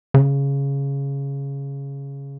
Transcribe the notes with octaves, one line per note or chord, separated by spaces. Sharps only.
C#3